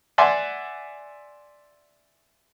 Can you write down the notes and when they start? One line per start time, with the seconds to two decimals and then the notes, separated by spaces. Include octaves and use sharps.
0.18 D5 E5 F#5 G#5 C6